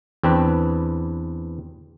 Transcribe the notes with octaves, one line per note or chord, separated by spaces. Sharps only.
E2 C4 D4 B4